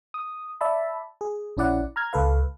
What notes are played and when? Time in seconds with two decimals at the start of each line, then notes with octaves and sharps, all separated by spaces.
0.14 D#6
0.61 D5 E5 A5 B5
1.21 G#4
1.57 A#1 C#4 E4 D5 F#5
1.96 A#5 F6 G#6
2.13 C#2 A4 B4 F5